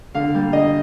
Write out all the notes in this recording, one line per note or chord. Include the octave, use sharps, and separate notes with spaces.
D3 F5
G3 A#3
D3 D#5